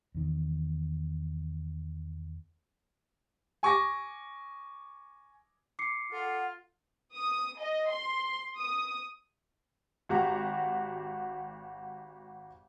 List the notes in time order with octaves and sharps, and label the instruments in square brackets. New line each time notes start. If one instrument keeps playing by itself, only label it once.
[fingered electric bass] E2 D#3
[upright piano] G#5 C#6 D6 A#6
[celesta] D6 C7 C#7
[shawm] F4 [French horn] A4 [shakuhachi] F#5
[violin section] D#6
D#5
C6
D#6
[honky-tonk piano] G#1 F#4 G4 A#5